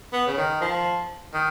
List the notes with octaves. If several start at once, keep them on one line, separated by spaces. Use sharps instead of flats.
B3
C#3
D#3
F3
D#3